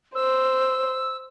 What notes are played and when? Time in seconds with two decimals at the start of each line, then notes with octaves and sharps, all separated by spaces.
0.15 C5 E6